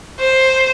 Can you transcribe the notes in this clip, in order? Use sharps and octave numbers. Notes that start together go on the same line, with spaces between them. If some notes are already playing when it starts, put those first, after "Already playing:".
C5